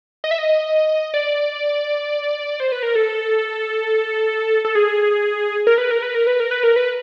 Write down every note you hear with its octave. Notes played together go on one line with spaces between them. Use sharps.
D#5
E5
D#5
D5
C5
B4
A#4
A4
A4
G#4
A#4
B4
A#4
B4
A#4
B4
A#4
B4
A#4
B4